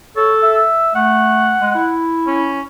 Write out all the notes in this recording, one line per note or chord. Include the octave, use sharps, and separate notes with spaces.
A4 C#5
E5
A3 F#5
G#3
E4
C#4